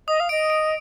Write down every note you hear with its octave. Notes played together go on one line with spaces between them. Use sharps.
D#5 D#6
F5
D#5 D7
D7